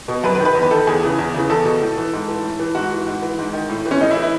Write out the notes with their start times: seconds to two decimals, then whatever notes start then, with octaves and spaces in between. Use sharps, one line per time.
0.08 B2
0.24 F#2 B4
0.35 B4
0.40 D#3
0.45 B4
0.55 E2
0.62 B4
0.71 D#3 A4
0.87 E2 G#4
1.03 C#3 E3
1.19 E2
1.34 C#3 E3
1.50 E2 A4
1.65 B2
1.81 A2
1.97 E3
2.13 G#2
2.28 E3
2.44 A2
2.59 E3
2.75 G#2 F#4
2.91 E3
3.07 G#2
3.22 E3
3.38 G#2
3.53 D#3
3.69 A2
3.85 E3
3.91 C#4
4.01 A2 D#4
4.11 E4
4.17 E3
4.22 E4